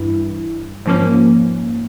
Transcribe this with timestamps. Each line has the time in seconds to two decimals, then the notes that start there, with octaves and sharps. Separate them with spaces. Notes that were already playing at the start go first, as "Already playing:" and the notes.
Already playing: G2 E3 E4
0.86 G#2 F3 A#3 C#4